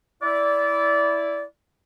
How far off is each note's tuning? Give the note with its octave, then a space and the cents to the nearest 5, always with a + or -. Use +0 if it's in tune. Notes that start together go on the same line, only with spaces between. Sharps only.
E4 +0 D5 -20